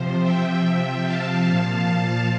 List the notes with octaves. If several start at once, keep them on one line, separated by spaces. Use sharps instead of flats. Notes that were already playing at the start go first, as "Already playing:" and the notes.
Already playing: C3 F3 C5
E5 G5
E5 G5
F5 A5
A#2 F3